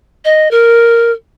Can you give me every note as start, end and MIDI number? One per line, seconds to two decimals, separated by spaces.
0.24 0.50 75
0.51 1.11 70